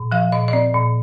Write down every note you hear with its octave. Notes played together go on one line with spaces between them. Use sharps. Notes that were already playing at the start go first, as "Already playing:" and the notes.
Already playing: A#2
F3 F5
A#2 D#5
D#5
C4 D5
A#2